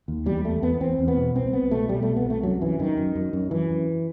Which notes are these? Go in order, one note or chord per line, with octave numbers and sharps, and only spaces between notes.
D#2
E2 G3
E2 A3
E2 B3
E2 C4
E2
B3
B2
C2 C4
C2 B3
B2 A3
B2 G3
C2 A3
B3
C2 A3
F#2 F#3
F#2 E3
F#2 D#3
F#2
F#2
F#2
F#2 E3
F#2